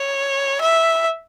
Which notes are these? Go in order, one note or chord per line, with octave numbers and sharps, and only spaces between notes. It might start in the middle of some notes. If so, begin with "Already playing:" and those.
Already playing: C#5
E5